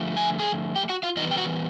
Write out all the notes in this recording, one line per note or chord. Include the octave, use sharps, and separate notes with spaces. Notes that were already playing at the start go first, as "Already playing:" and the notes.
Already playing: D3 F3 A3
G#5
G#4 G#5
G4 G5
F#4 F#5
F4 F5
E3 G3 B3 D#4 D#5
G5
F#4 F#5